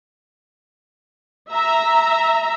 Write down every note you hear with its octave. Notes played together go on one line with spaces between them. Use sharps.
E5 A#5